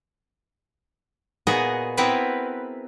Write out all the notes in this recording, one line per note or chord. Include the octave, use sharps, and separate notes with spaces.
A#2 B3 F#4 G#4 D#5
B3 C4 E4 A#4 B4